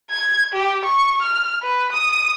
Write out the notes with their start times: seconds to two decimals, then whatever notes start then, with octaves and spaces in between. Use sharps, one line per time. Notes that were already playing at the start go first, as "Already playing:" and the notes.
0.10 G#6
0.53 G4
0.85 C#6
1.22 F6
1.62 B4
1.92 D#6